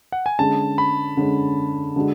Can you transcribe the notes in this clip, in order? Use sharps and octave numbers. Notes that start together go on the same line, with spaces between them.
F#5
G#5
D3 G#3 C#4 A5
B5
D3 G#3 C#4
D3 G#3 D4 F#4